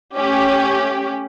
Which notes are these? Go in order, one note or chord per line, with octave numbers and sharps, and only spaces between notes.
A3 C#4 G4